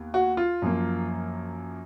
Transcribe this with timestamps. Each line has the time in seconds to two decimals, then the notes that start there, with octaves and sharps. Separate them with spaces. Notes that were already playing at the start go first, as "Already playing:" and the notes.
Already playing: D#2 B3
0.14 F#4
0.37 F4
0.62 F#2 F3 A#3